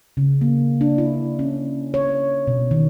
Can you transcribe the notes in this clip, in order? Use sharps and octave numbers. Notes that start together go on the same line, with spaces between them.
C#3
A#3
D4
E4
C#4
C#5
B2
D#3